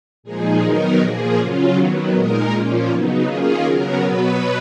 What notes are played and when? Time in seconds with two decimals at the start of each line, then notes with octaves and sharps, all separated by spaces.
0.23 A#2 F3 G#3 D#4 G#4
0.61 D#3 F#3 B3 D#4 A#4
0.99 A#2 F3 A#3 G#4
1.37 C#3 F#3 C#4 F4
1.75 D#3 F#3 B3
2.12 A#2 G#3 D#4 A#4
2.51 A#2 F3 A#3 C#4 F4
2.88 C#3 F#3 B3 D#4
3.26 D#3 A#3 C#4 F4 G#4
3.64 C#3 F#3 B3 A#4
4.02 B2 F#3 B3 B4